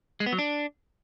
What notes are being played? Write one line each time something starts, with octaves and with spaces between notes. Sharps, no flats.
G#3
B3
F#3
D4